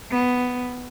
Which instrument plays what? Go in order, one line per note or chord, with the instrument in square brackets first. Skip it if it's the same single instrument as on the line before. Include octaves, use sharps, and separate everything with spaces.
[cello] B3